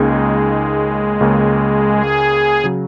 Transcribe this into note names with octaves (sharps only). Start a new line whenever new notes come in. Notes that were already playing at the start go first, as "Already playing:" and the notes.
Already playing: C#2 C#3 G#3 A#3 D#4 G#4
C#2 C#3 A#3
G#4
C#3 F#3